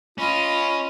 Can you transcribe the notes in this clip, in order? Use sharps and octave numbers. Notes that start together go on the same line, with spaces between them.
C#4 F4 D#5 B5